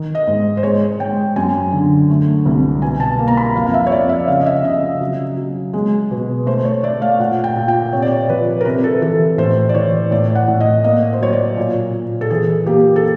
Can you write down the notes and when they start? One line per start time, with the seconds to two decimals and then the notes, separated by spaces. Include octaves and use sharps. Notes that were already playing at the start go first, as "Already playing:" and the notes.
Already playing: D#3
0.15 D#5
0.27 G#2
0.57 C5
0.63 G#3 C#5
1.00 G#3 G5
1.36 F#2 G#5
1.72 D3
2.10 A3
2.46 C2
2.82 B2 G#5
3.00 A5
3.19 A#3
3.28 A#5
3.37 B5
3.56 F2 F5
3.66 F5
3.74 E5
3.87 C#5
3.92 F2 D5
4.09 E5
4.28 C#3 F5
4.39 D#5
4.46 E5
4.64 C#3 D#5
5.01 F#3
5.37 F#3
5.73 G#3
6.11 B2
6.46 A3 C5
6.65 C#5
6.83 A3 D5
7.02 F5
7.19 A#2 F#5
7.44 G5
7.56 A#2
7.68 G5
7.93 C3 C#5
8.02 D5
8.12 C#5
8.29 F3 B4
8.61 A#4
8.65 C3 B4
8.84 A4
9.02 E3 A4
9.38 A2 C5
9.69 D5
9.74 E3 C#5
10.11 A2 D5
10.35 F#5
10.48 A2
10.60 D#5
10.84 A#3 D#5
11.13 C5
11.21 F#3 C#5
11.33 D5
11.57 A#2
11.93 A#2
12.21 A4
12.30 E3 G#4
12.66 A#3 G4
12.96 A4